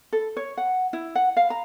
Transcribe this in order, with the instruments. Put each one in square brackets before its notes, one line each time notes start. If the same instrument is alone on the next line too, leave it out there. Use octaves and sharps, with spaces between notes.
[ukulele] A4
C#5
F#5
E4
F#5
F5
A#5